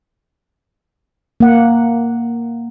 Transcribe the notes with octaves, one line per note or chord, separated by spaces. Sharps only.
A#3 F#5